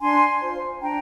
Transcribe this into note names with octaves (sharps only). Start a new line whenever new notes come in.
D4 G#5 C6
F4 C5
D4 G5 A#5